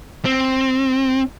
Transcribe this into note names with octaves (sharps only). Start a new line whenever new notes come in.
C4